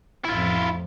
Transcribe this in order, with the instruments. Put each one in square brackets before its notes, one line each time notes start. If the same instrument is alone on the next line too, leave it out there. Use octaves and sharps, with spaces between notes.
[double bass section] A1 F2 [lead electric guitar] E4 F4